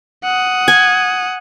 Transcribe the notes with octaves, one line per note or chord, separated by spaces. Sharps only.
F#5 D#6
G#5